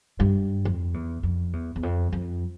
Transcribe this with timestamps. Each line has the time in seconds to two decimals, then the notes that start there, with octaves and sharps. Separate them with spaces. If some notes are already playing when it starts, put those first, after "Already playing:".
0.20 G2
0.65 F2
0.94 E2
1.23 F2
1.53 E2
1.76 E2
1.83 F2
2.12 F2